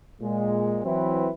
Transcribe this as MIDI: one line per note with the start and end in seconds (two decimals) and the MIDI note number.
0.21 0.79 46
0.21 0.79 56
0.84 1.30 52
0.84 1.30 54
0.84 1.30 60
0.84 1.30 64
0.84 1.30 71